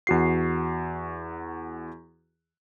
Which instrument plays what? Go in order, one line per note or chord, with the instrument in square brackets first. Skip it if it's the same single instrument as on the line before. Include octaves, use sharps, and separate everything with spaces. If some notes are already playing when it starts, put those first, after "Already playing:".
[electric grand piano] E2 F#4 C7